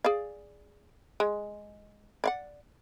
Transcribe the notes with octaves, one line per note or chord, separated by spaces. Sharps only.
G#4 D5 F5
G#3
D5 F5 F#5